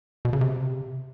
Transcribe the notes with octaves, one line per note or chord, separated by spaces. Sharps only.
B2
C#3
C3